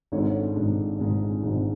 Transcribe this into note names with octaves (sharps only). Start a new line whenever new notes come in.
G#1 G#2 G#3 D4 A4 C#5
G#1 G#2 G#3 D4
G#1 G#2 G#3 D4
G#1 G#2 G#3 D4